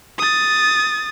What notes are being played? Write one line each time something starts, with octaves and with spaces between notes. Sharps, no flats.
D#6 A6